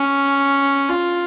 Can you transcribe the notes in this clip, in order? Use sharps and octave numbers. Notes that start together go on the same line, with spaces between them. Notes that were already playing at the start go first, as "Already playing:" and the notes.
Already playing: C#4
F4